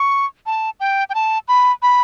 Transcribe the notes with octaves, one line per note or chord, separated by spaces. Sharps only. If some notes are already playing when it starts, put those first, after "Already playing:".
Already playing: C#6
A5
G5
G5
A5
B5
B5